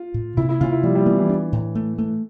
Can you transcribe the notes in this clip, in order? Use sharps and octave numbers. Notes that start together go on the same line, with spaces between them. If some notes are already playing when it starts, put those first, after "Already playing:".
Already playing: F4
A2
C3 E4
E4
C3 F4
E4
F3 G3
G3
E3 B3
E3
D4
A2
A3
A3